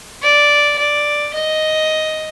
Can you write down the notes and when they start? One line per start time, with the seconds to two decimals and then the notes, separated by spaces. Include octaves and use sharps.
0.22 D5
0.78 D5
1.33 D#5